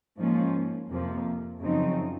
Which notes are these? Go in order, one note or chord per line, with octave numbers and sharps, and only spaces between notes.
G#2 F3 A#3 C#4
F2 C3 F3 A#3
F#2 C#3 F3 C4 D#4